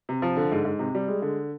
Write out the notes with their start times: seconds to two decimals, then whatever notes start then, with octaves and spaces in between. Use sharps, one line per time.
0.09 C3
0.22 F3
0.36 D3
0.52 G#2
0.65 G#2
0.79 C3
0.95 G3
1.08 G#3
1.22 D3